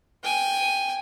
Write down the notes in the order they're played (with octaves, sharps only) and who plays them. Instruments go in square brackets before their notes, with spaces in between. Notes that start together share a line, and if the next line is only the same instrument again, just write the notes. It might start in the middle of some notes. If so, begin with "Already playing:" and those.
[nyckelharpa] G5 G#5